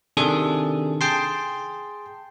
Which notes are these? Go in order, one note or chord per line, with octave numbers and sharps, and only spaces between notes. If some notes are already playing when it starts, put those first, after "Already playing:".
C3 D#3 D4 G#4 A4
G#4 G5 A5 C6